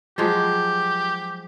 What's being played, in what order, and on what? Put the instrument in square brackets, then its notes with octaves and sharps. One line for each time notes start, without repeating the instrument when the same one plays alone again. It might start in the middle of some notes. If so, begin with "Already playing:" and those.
[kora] F3 F#3 G#3 [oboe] G4